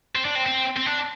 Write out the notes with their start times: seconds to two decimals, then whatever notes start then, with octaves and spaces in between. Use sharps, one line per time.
0.15 C4
0.25 D4
0.35 C4
0.46 C4
0.76 C4
0.86 D4